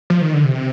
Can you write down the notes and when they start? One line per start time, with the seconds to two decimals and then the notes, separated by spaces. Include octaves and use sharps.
0.10 F3
0.22 D#3
0.33 D3
0.44 C3